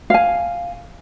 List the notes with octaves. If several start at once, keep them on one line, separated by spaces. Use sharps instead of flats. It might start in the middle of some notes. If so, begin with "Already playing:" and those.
F5 G#5